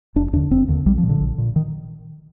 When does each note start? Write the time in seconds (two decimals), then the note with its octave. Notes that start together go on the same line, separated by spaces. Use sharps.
0.16 F1 D4
0.33 D#2 D4
0.36 D3
0.51 F1 C4
0.68 D#2 D3
0.86 A#1 G3
0.98 F3
1.03 A#2
1.09 D3
1.20 A#1
1.38 A#2
1.56 D#3